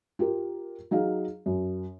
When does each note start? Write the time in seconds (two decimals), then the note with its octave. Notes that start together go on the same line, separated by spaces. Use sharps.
0.19 F4 G4 A#4
0.91 F#3 D#4 G#4 F5
1.46 F#2